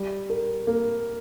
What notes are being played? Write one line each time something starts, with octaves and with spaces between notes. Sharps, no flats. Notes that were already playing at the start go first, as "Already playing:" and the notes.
Already playing: G3
A#4
A#3